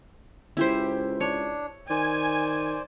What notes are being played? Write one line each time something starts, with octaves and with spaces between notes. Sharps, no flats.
C#2 E4 G4 C5
D4 C#5
D#3 C5 D5 G#5